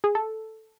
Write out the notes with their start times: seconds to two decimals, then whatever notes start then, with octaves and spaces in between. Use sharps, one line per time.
0.04 G#4
0.15 A4